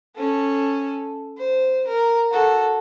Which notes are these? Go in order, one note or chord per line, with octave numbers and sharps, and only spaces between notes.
C#4 A4
C5
A#4
F#4 A4